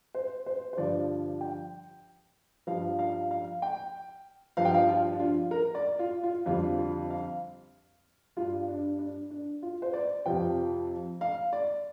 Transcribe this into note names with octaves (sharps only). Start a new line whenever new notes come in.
C5
C5
C5
G2 D3 F3 D5
G5
G2 F3 F5
F5
F5
G5
G2 F3 F5
G5
F5
F4
D4
F4
A#4
D5
F4
F4
F2 D3 G3 F4
F4
F5
G2 G3 F4
D4
D4
D4
F4
C5
D5
F2 C3 F3 G5
F5
D5